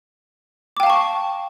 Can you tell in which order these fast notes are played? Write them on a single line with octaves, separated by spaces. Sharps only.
D6 G5 F5 A5 C#6